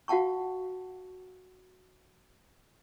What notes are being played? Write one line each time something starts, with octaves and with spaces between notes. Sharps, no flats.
F#4 F5 F#5 A5 C#6